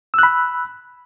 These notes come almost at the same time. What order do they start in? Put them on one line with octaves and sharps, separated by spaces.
E6 F#6 B5